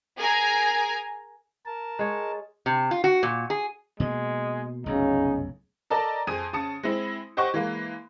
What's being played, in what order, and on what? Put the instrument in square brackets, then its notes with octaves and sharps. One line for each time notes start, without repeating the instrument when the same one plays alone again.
[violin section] G#4 A#4 G#5 A#5
[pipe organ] A#4 A5
[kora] G#3 C#5
[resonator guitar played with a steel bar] C3
F4
F#4
A#2
G#4
[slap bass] B2 A#3 [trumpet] G#3
[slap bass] F1 B1 F#2 [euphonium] C#3 [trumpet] D#4
[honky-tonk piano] A4 A#4 D5 D#5 A5
F2 G#4 D#6 D#7
C#3 A5 D#6 C#7
G#3 C4 E4
G4 C5 D#5 F#5 C#6
E3 G#3 A#3